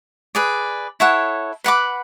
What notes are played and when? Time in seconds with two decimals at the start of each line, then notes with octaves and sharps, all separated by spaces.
0.35 G#4 B4 D5
1.00 E4 A4 C#5 F#5
1.64 B4 F#5 B5 D6